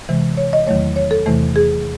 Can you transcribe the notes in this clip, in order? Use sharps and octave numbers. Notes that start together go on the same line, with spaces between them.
C3 E3 G#3
C#5
D#5
E2 D#3 F#3 A3 C#5
C#5
A4
E2 C3 E3 A3
G#4